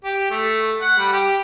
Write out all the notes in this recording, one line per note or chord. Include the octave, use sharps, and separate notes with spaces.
G4
A3
F#5
G3
G4